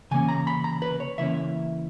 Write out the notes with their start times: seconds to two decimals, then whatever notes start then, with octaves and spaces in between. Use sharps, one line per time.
0.11 C#3 E3 A#3 C#4 G#5
0.29 A#5
0.47 B5
0.64 A#5
0.82 B4
1.00 C#5
1.18 C#3 E3 A#3 C#4 E5